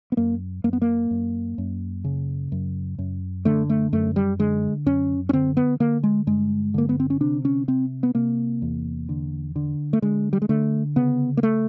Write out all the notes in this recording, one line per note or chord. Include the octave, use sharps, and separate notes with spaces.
B3
F#2 A#3
F#2 A#3
B3
A#3
F#2
F#2
C#3
F#2
F#2
D3 A3
A3
F#2 A3
G3
D3 G#3
F#2 C#4
C#4
D3 C4
B3
D3 A#3
G#3
G2 G#3
D3 A#3
B3
C4
C#4
C3 D4
C#4
C3 C4
B3
C3 A#3
E2
D3
D3
A3
D3 G#3
G3
G#3
D3 A3
C#3 B3
A#3
A3